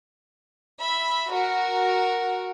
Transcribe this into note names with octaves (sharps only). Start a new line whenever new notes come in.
E5 B5
F#4 A#4